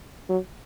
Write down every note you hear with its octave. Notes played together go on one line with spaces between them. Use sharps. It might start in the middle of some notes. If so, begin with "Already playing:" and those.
F#3